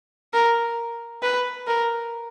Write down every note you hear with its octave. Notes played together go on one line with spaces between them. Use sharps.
A#4
B4
A#4